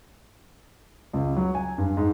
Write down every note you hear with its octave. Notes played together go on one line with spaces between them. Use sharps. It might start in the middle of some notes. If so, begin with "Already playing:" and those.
C#2
F#3
G#5
G2
G#2